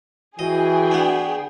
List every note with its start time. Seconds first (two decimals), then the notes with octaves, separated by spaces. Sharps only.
0.39 E3 F#4 G#4 D#5 G5
0.91 B3 D4